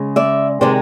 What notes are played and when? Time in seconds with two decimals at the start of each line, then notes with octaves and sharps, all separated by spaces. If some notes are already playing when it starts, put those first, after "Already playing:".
Already playing: C#3 G#3
0.16 D5 E5
0.61 C3 D#3 G#3 C5 D5